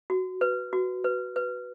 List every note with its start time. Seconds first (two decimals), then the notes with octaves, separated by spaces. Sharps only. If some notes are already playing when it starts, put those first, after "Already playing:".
0.10 F#4
0.41 B4
0.73 F#4
1.04 B4
1.36 B4